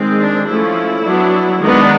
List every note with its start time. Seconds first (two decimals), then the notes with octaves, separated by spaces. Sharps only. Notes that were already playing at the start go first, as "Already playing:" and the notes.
Already playing: D#3 G#3 C4
0.18 D4
0.47 F3 A3 C#4 E4
1.04 F#3 B3 D4
1.60 D#3 G#3 B3 D4 D#4